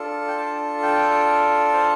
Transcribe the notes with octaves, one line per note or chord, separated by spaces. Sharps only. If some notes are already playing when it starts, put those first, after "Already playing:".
Already playing: D4 F4 A4
G5
A5
G5
C5